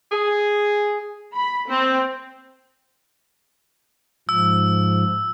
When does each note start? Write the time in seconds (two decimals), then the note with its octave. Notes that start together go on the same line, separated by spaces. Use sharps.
0.11 G#4
1.35 B5
1.68 C4
4.29 G#2 F3 E6